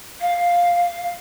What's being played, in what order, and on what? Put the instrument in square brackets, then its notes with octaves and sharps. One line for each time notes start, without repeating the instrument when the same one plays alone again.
[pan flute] F5